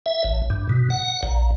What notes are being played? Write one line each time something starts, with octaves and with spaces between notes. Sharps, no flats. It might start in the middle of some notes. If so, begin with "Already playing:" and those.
E5
A1
G2
B2
F#5
A#1